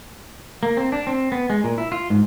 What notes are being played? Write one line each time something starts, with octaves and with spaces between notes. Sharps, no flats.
A#3
C4
D4
C4
B3
G#3
A#2
E4
F4
G#2